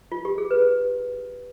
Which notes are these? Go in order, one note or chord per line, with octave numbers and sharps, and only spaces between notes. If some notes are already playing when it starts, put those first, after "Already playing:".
F4
G4
G#4
B4